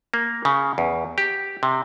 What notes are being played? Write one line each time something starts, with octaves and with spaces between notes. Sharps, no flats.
A#3
C#3
E2
G4
C3